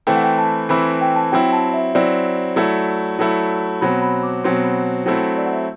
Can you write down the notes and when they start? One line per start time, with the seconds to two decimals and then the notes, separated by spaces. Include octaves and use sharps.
0.07 E3 A3 C4 E4 G5
0.16 F#5
0.24 G5
0.38 A5
0.69 E3 A3 C4 E4 B5
1.01 G5
1.16 A5
1.32 F#3 C4 E4 G5
1.53 A5
1.74 E5
1.95 F#3 C4 E4 D5
2.56 F#3 A3 E4
3.19 F#3 A3 E4
3.81 B2 F#3 C4 B5
4.02 B5
4.23 D6
4.44 B2 F#3 C4 C6
4.64 B5
5.06 F#3 A3 C4 E4 G5
5.38 D5
5.46 F#5
5.53 E5